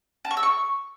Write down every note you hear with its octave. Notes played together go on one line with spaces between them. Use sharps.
A5
C#6
E6
C#6